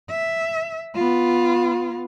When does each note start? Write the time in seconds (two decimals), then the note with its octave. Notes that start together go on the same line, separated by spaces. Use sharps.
0.10 E5
0.95 B3 F4